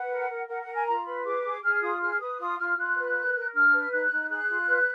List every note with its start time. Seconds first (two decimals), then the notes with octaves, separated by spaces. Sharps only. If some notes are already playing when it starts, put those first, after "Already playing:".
Already playing: B4 F#5
0.10 A#4
0.29 A#4
0.48 A#4 F#5
0.61 F#5
0.66 A#4
0.73 G#5
0.86 F4 A#5
1.05 B4 B5
1.24 G#4 D6
1.44 G#4
1.62 G#4 F6
1.81 F4 D#6
2.00 G#4 F6
2.20 B4 D#6
2.39 F4 D#6
2.58 F4 F6
2.76 F4 F#6
2.96 B4
3.15 A#4
3.35 A#4
3.53 D4 F6
3.72 B4
3.91 D#4 F#6
4.10 D#4
4.29 G#4 F#6
4.48 F4
4.68 B4